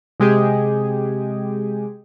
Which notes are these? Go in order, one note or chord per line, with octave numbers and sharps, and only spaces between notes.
C3 G#3 G4 G#4